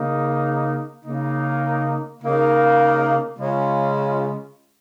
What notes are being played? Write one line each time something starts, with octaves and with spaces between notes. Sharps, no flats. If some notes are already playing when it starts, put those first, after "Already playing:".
Already playing: C#3 A#3 D#4
C#3 A#3 D#4
C#3 A#3 D#4
C#3 G#3 C#4 F4